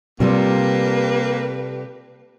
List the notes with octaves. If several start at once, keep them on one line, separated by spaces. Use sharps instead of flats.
C3 G3 A#3 F4 G4 A4 B4